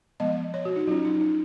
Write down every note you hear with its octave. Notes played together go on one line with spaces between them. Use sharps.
F3 G#3 B3 D#5
C#5
F#4
D#4
F#3 C#4 F4
D#4
D#4